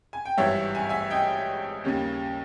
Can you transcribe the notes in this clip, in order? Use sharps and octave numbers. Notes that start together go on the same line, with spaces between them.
G#5
G5
G#1 G2 E3 G3 C#5 E5
G#5
E5 G#5
D#5 G5
D#2 C#3 G3 A#3 C#4